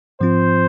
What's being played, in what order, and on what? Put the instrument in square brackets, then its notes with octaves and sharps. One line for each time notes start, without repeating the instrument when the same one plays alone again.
[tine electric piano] G#2 F3 C4 F4 [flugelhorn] C5